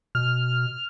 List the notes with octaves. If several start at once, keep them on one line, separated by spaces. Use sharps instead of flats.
B2 F6